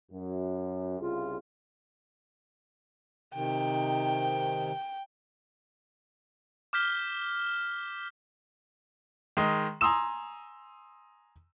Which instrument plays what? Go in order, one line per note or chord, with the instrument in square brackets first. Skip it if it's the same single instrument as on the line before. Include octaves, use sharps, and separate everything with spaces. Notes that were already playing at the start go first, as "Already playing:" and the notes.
[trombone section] F#2
C2 C#3 F4
[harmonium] C3 D#3 [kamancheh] G5
[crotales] D6 F6 G6 B6 G7
[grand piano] D#3 G#3 D#5
G#5 A#5 C6 D#6 E6 E7